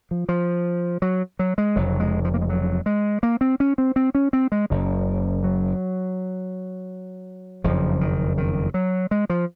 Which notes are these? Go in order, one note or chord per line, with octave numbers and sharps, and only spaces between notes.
F3
F3
F#3
F#3
G#3
F1 F2 C#3 F#3
G#3
F3
A#3
G#3
F#3
G#3
A#3
C4
C#4
C4
C4
C#4
C4
G#3
F#1 F#2 C#3
F#3
F#1 F2 C#3 F3
D#3
D#3
F#3
G#3
F3